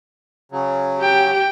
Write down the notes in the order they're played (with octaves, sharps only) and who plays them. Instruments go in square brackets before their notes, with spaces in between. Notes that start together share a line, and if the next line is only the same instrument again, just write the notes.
[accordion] C#3 F#3
[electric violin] G4 G5